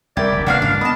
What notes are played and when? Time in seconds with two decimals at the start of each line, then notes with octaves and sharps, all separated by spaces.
0.17 C2 G4 A#4 D5 E5 G#6
0.32 F#1 D2 B6
0.47 C3 A#3 D4 F#4 B4 F5 G5
0.62 D2 G2 C#3 F5
0.81 A3 B3 D#5 A5 B5